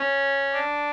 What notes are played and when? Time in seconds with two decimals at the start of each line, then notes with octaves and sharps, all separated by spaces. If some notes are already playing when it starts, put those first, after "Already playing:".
Already playing: C#4
0.52 D4